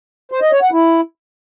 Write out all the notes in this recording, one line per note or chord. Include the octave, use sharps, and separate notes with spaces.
C5
D#5
C#5
F#5
E4